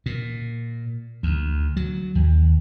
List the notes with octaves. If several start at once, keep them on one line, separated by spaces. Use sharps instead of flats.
A#2
D2
F#3
D#2